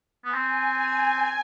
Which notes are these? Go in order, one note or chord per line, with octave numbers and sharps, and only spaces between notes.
B3
C4 G#5